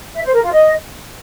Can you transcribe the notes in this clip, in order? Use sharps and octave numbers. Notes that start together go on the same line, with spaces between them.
E5
C5
A#4
F4
D#5